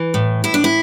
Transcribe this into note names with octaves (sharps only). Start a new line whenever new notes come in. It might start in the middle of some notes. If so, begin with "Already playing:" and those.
Already playing: E3
A2
A2 E4
D4
E4